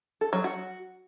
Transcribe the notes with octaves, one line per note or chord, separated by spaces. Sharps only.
A4
F#3
F#4